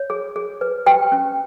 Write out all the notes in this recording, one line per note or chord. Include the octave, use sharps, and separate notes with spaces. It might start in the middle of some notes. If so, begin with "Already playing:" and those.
Already playing: C#5
G#4
G#4
B4
G4 B4 G5
C#4